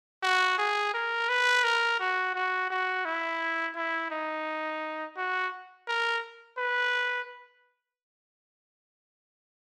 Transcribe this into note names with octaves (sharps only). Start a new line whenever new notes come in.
F#4
G#4
A#4
B4
A#4
F#4
F#4
F#4
E4
E4
D#4
F#4
A#4
B4